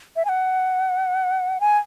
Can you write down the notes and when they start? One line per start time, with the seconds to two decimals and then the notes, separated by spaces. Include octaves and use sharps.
0.16 E5
0.25 G#5
0.29 F#5
1.61 G#5